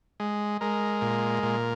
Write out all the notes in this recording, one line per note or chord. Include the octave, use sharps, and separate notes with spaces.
G#3
G#3 A#4
A#2
A#2